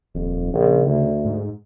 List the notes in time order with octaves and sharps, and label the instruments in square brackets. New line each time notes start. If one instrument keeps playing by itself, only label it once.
[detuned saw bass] D#1 [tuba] F2
[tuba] A#1 [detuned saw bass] C#3
[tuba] D2
[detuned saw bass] G#2